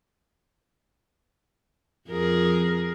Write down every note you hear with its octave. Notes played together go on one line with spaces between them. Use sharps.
F2 G#4 A#4